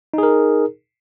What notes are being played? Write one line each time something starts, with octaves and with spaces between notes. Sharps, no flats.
D#4 G#4 A#4